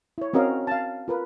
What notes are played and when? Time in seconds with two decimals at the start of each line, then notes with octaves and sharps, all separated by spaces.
0.18 E4 C#5
0.33 C4 C#4 F#4 A#4 D#5 F5
0.67 F5 A5
1.08 F4 A#4 B4